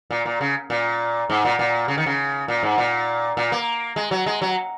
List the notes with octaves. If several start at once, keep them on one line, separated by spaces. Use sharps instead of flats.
A#2
A#2
C#3
A#2
G#2
A#2
A#2
C#3
D#3
C#3
A#2
G#2
A#2
A#2
A#3
G#3
F#3
G#3
F#3